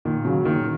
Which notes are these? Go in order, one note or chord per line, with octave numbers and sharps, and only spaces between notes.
A#2 D#3
C#3 F#3
A#2 D#3